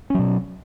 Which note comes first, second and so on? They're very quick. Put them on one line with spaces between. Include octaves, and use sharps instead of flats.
C#4 F#3 B2